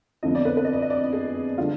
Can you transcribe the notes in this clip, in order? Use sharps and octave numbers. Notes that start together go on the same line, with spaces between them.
F2 D3 F3 B3 D#5
D5
B4
B4
D#5
D5
D#5
D5
G#4
D3 G3 D4 F4